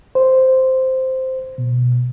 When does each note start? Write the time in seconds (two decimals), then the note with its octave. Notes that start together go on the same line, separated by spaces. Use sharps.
0.15 C5
1.58 B2